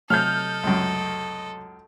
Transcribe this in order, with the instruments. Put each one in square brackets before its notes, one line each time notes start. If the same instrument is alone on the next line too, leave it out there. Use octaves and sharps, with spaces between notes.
[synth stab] C3 F#3 A3 [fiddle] A4 D#5 [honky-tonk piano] F6 G6
[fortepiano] C#2 F#2